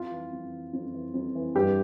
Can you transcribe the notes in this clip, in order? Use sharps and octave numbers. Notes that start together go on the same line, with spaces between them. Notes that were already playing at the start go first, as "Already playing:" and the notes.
Already playing: F2 F4
E3
F2
E3
F2
E3
F2
E3
G2 G4